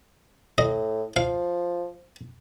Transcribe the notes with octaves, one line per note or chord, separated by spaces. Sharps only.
A2 D#5
F3 F5